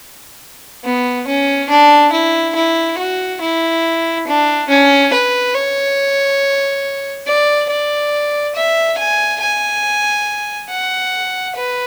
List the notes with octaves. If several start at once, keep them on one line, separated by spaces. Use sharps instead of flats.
B3
C#4
D4
E4
E4
F#4
E4
D4
C#4
B4
C#5
D5
D5
E5
G#5
G#5
F#5
B4